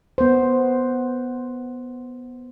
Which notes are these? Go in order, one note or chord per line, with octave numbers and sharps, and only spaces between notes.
B3 C5